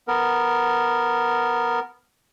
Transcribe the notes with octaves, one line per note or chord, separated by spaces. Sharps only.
B3 A#4